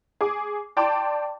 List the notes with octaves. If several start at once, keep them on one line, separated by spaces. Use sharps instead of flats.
G#4 D6
D5 G5 A5 C6 D6